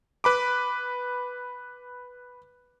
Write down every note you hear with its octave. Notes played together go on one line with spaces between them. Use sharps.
B4 B5 D6